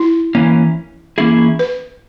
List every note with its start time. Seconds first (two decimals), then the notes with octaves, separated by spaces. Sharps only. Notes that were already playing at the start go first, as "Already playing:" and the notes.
Already playing: E4
0.35 E3 A#3 C#4
1.18 E3 A#3 C#4 E4 G#4
1.59 B4